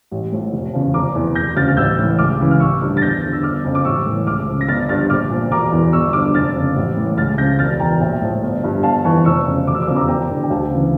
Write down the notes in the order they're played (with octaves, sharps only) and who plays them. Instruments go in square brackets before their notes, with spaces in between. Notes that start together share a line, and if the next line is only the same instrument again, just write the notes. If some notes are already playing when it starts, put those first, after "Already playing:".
[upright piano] A1
A2 F3
F1
E2 C#3 F3
F1 A#5 D6
E2 E3
E1 G6 A#6
D2 C#3 F6 A6
F6
A1 E6 G6
A2 E3
C#2 D6 F6
C#3 E3
F6
A1 C#6 E6
G2 D3 F3
A6
E2 G6 A#6
D3 F3
E6
G1 D6 F6
F2 C#3
D6
A1 C#6 E6
A2 E3
C#2 D6 F6
C#3 F3
A#6
G1 F6 A6
G2 D3 F3 F6 A6
A#1 D6 F6
A#2 F3
E1 A#5 D6
E2 E3
G1 C#6 E6
G2 D3 F3 D6 F6
F1 F6 A6
F2 C#3
A1
A2 E3
C#2 F6 A6
C#3 F3 G6 A#6
E1 F6 A6
E2 E3 G5 A#5
A#1 E5 G5
A2 F3
G1
G2 F3
G1 F5 A5
F2 E3 A5 C#6
F1 C#6 E6
F2 C#3 F3
E1 D6
E6
D6
E2 C#3 F3 E6
A#5 D6
E1 G5 A#5
E2 D3
G5
D2 F5 A5
C#3 E3